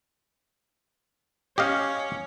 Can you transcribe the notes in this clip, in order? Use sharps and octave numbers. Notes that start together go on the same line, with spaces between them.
C#4 G4 D#5 F5